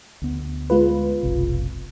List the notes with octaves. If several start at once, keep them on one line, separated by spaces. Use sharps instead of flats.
D2 B3
G#3 F4 B4
F1 B1 C3